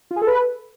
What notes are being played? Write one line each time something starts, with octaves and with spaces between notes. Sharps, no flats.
F4
G#4
A4
B4